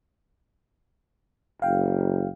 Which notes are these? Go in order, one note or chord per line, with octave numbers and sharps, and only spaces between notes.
F#1 F5 G5